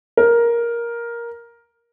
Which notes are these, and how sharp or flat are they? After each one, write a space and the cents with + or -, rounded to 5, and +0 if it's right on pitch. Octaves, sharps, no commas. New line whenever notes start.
A#4 +10